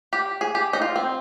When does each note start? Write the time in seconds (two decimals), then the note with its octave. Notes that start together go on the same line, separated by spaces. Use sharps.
0.13 G4
0.41 G#4
0.55 G4
0.73 D#4
0.82 F4
0.96 C4